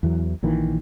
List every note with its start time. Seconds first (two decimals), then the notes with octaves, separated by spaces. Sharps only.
0.03 E2 E3 F#3
0.43 A#1 A#2 D#3 E3